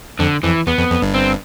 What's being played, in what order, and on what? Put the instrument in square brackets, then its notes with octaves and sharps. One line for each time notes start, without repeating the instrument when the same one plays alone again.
[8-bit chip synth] F2 [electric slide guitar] D3
[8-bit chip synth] F2 [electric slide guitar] E3
[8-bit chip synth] E2 [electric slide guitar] B3
[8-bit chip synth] F2
F2
G1 G2
[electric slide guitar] C4